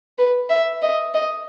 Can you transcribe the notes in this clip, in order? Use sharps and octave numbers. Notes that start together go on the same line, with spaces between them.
B4
E5
D#5
D#5